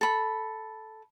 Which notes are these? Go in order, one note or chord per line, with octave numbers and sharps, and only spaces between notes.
A4 B5